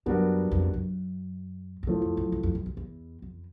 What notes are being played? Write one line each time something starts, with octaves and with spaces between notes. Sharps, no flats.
F#2 G3 B3 D4 F#4 A#4
F2
F#2
E2
F2 A2 F3 A3
F2
F#2
F#2
F2
F#2
F#2
E2
F2